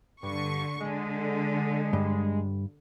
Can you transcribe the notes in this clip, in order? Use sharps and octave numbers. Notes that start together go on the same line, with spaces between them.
G2 D3 C#6
D3 G#3
G2